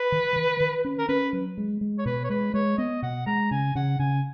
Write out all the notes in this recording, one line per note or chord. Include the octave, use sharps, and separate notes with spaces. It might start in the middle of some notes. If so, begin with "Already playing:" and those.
Already playing: B4
D#3
D#3
D#3
C#4
A#4
C#4 B4
F#3
G#3
G#3
C#5
B2 B4
C#5
G#3 B4
G#3 C#5
B3 D#5
B2 F#5
G#3 A#5
C#3 G#5
C#3 F#5
C#3 G#5